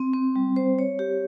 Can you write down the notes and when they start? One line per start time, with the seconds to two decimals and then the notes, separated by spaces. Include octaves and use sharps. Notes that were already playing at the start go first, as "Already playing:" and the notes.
Already playing: C4
0.13 C4
0.36 G3
0.56 C5
0.79 C#5
0.99 G4